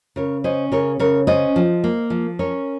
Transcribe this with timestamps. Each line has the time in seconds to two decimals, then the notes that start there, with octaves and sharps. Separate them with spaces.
0.16 C#3 A#4 C#5
0.44 C#4 C5 D#5
0.72 C#3 A#4 C#5
0.99 C#3 A#4 C#5
1.27 C#4 C5 D#5
1.56 F3
1.84 A#3
2.10 F3
2.39 C#4 A#4 C#5